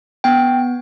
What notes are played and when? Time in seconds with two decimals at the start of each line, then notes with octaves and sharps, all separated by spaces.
0.24 B3 G5